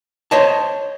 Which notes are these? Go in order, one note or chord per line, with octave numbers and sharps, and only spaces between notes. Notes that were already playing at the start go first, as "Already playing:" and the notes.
C5 C#5 D#5 A5